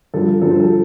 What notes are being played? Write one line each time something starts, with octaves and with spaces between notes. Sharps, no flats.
G2 D3 F3 A4
G2 D3 F3 A4
C5
A4